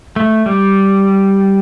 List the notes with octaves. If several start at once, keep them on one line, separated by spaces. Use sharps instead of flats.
A3
G3